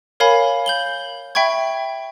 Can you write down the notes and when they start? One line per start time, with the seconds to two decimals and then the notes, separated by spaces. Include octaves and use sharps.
0.20 A#4 C#5 F5 G#5 B5
0.66 G6 F#7 G7
1.35 E5 G5 B5 C#6 G#6